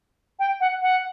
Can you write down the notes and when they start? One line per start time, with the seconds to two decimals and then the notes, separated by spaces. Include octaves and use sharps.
0.39 G5
0.60 F#5
0.82 F#5